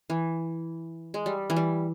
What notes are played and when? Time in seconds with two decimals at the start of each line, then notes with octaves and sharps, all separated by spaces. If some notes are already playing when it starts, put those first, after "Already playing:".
0.10 E3
1.14 G#3
1.26 G3
1.50 E3
1.56 G3